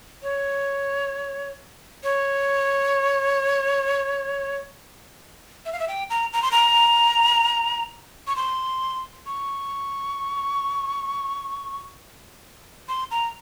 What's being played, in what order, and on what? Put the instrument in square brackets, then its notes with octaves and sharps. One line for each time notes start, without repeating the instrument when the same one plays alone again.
[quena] C#5
C#5
E5
F5
E5
G5
A#5
A#5
C6
A#5
C#6
C6
C#6
C6
A#5